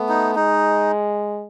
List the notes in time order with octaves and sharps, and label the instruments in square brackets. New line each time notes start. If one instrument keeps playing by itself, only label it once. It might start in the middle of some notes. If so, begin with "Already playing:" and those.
Already playing: [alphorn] A3 [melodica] B3
[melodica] D#4
[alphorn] G#3 [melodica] D#4